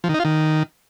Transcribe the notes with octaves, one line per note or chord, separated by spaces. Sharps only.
F3
D#3
D#4
F4
D#3